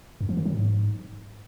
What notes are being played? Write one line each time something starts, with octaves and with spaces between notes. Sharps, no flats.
F#2
F3
D#3
F#3
G#2